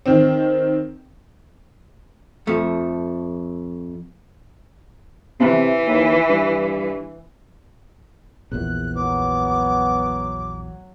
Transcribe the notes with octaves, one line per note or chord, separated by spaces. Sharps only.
D#3 C4
F2 A3
C3 E3
D#2
G2
A#1 E2 F#6
F#3 B3 D6